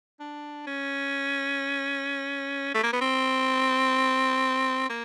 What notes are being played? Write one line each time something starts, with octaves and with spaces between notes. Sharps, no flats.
D4
C#4
A3
A#3
B3
C4
A#3